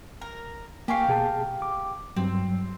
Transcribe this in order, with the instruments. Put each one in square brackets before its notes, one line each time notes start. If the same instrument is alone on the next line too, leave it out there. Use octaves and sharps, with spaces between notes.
[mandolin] A#4
[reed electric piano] A#3 G#5 C#6 [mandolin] G4 A#4 F5
[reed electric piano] B2 G#4 A5
D6
[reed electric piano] G2 F#3 [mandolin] C4